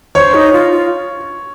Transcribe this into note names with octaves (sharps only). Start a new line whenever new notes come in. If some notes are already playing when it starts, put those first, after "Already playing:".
C5 C#5
D#4
F4
F4